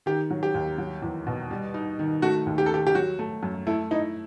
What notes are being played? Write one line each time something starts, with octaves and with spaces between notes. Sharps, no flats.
D#3 G4
F#3
G4
D#2
F#3
E2
B2
G3
D#4
D#3
A3 F#4
D#2
G4
A4
D#3 G4
G4
F#3 F#4
A3
F#2
A3 E4
D#4 E4